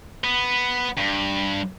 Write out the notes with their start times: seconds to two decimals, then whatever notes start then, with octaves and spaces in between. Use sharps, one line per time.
0.24 B3
0.98 G2